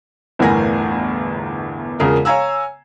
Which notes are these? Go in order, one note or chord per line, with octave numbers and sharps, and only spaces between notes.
G1 E2 A2 A#4 G#5 A#6
E1 C#3 F4 G#4 A#4
C#5 F5 G#5 A#5 E6